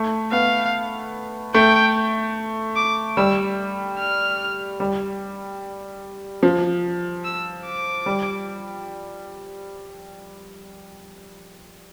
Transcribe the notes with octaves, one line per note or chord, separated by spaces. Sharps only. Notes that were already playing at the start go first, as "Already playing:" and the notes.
Already playing: A3
B3 F5
A3 G5
D6
G3 E6
F6
G3
F3
E6
D6
G3